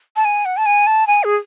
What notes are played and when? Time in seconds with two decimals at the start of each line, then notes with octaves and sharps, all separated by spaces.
0.16 A5
0.25 G#5
0.45 F#5
0.57 A5
0.66 G#5
0.87 A5
1.07 G#5
1.24 G#4